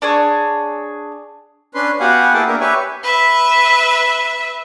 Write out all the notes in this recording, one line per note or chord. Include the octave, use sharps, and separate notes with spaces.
D4 G#4 C#5
C#4 D4 B4 C6
B3 F#4 G4 F5 F#5 G#5
A#3 E4 G#4 G5 A5
A#3 B3 D4 A#4 E5
G4 B4 C#5 E5 G#5
B4 E5